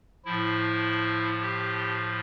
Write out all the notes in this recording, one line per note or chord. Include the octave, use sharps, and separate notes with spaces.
A2 F3 E4
G4